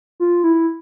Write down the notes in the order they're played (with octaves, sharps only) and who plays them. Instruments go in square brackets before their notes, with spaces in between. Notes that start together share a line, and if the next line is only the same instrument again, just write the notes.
[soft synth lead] F4
E4